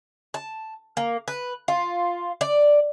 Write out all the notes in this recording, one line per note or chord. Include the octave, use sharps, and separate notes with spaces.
A5
A#3
B4
F4
D5